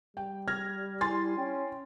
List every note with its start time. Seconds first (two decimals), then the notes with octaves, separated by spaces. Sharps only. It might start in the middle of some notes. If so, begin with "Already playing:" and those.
0.17 G3 G5
0.48 F6 G#6 A#6
1.01 E4 G#5 C6 A6
1.38 C#4 G5